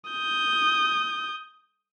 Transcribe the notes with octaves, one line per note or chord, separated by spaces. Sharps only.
D#6 G6